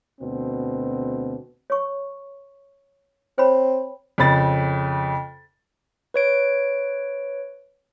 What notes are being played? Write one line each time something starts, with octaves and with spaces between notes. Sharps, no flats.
D2 B2 C4
C#5 C#6
C4 C5 C#5 B5
F2 C#3 B5 A6
B4 C#5 D7